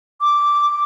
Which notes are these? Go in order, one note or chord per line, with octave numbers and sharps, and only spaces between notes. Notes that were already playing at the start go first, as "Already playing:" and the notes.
D6